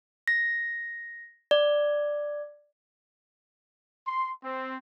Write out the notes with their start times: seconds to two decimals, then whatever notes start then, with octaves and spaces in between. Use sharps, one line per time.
0.28 A#6
1.51 D5
4.07 C6
4.44 C4